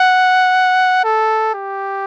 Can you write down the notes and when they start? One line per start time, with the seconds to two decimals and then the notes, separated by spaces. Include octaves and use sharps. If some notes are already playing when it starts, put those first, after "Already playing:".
Already playing: F#5
1.04 A4
1.54 G4